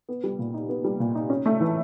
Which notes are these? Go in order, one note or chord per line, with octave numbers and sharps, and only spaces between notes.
B3
G3
A#2
D#4
B3
G3
A#2
D#4
C#4
A3
E3